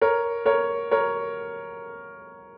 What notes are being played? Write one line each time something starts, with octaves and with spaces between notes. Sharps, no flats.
A#4 C#5
A#4 C#5
A#4 C#5